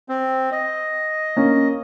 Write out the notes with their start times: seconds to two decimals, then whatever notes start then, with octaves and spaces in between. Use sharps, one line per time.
0.09 C4
0.52 D#5
1.36 A#3 C#4